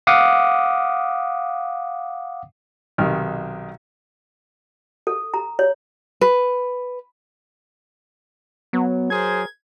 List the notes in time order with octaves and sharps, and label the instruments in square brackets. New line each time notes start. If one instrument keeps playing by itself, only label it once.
[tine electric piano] F5 F#5 D6 D#6
[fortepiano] B1 C3 D#3 F6
[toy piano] A4
A#5
C#5
[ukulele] B4
[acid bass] F#3 [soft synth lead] B3
[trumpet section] G#4 A#4 C5 [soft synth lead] G#6